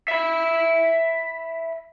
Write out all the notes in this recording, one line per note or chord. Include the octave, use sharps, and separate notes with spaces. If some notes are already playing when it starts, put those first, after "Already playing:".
E5 B5